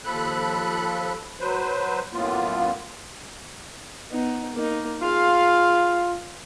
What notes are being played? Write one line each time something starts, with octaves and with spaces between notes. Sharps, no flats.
D#2 F3 A4 B5 F#6
F#3 B4 C5
F#2 A2 A#3 B3 F4
B3 D#4
A#3 D#4
F4 G#4 F5